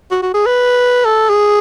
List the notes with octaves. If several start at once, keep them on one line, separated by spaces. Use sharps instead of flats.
F#4
F#4
G#4
B4
A4
G#4